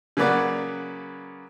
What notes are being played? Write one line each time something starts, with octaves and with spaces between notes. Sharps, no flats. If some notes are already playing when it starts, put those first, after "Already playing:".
C#3 F#3 A#3 B4 D5 F#5